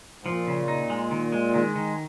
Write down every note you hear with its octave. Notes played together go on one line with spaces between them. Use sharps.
G#2
A#2 F3
C#3
D#4
G#3
D#3
G#3
D#3 G#3
D#3